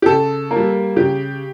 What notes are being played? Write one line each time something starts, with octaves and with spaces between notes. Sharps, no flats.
G4
C#3 A4
A#3
G3
C#3 G4